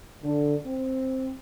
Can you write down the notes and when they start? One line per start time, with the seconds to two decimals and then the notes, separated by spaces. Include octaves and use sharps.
0.24 D3
0.65 C4